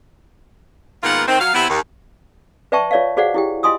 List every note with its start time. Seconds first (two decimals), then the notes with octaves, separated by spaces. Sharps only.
1.03 G#2 D#3 A#3 B3 F4 F#5
1.27 D#3 C4
1.39 F#3 F5
1.54 C3 B3 C4 E4
1.69 D#2
2.72 B4 D5 E5 G5 A5 C#6
2.91 F4 C#5 D5 E5 F5
3.17 F#4 G#4 C5 D5 F5 F#5
3.34 E4 G4 G5
3.63 F4 D#5 G#5 C6 D#6 E6